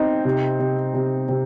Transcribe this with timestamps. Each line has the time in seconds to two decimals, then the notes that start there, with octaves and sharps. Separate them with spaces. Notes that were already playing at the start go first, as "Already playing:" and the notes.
Already playing: C4 D#4
0.25 C3
0.59 C3
0.94 C3
1.29 C3